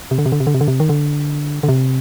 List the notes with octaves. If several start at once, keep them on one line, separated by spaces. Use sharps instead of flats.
C3
D3
C3
D3
C3
D3
C3
D3
C3
D#3
D3
D3
C3